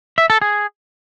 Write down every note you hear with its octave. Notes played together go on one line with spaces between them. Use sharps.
E5
A4
G#4